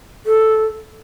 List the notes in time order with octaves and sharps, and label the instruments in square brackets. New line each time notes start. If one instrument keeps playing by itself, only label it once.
[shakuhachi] A4